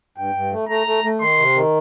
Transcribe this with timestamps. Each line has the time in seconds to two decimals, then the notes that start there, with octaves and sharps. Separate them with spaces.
0.18 G2 G5
0.35 G2
0.52 A3
0.69 A3 A#5
0.87 A3
1.04 A3
1.21 D#3 C6
1.39 C3
1.55 D#3